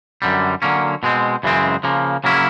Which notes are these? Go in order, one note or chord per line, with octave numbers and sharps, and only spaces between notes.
F#2 D3 G3
D3 F#3 A#3 C#4
B2 G#3 C4
F#2 C#3 E3 G#3 C4
C#3 F3 A#3
C#3 F#3 A#3 C#4 E4